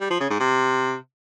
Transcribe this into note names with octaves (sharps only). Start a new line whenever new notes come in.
G3
F3
C#3
G#2
C3